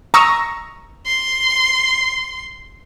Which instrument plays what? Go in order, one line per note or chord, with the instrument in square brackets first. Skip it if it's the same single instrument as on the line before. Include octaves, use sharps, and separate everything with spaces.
[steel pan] A#5 [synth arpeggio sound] C#6 D#6 E6
[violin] C6